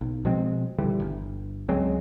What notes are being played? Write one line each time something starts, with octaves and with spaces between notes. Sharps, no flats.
B1
B2 F3 G#3 C4
D#1 D3 E3 G3
G1
C#2 F#3 G#3 C4